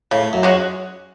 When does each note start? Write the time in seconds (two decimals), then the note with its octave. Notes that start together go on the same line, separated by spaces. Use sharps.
0.11 A2 C#3
0.33 F#2
0.43 G#3 C#4 F#4